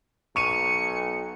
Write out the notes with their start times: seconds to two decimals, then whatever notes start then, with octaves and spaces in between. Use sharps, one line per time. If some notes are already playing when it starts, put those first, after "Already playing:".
0.36 B1 C#6 C#7 D#7